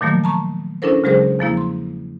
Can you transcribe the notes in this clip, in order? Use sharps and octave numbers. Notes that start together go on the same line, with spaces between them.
A#2 D#3 F3 F#3 A3 A#3
A5 A#5 C#6
C#4 D4 E4 A4 A#4 C5
C#3 F#3 G#3 G#4 A#4 C5
E2 F3 A#3 E4
C6